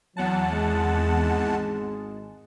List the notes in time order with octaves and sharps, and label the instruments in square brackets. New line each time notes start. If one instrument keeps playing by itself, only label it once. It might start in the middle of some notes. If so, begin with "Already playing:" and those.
[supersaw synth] E2 F#5 A5 [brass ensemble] F#3
[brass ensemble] G#1 G#3